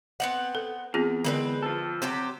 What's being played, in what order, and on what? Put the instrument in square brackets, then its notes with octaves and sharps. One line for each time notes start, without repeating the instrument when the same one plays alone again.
[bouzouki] B3 C4 F#5
[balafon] A4
[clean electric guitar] E2 [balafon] C4 F4 G#4
[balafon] D3 A#4 D5 [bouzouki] G#3 C4 B4
[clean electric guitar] F3 A4
[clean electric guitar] C3 [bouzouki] F#3 G4 C5